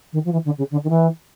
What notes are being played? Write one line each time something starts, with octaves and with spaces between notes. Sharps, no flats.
D#3
F3
E3
D3
C#3
D3
D#3
E3